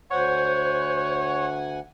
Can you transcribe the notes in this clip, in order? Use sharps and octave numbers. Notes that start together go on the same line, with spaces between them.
D2 C5 C#5 F#5 G#5